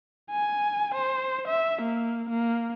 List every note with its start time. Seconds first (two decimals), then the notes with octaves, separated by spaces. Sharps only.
0.30 G#5
0.94 C5
1.48 E5
1.82 A#3
2.29 A#3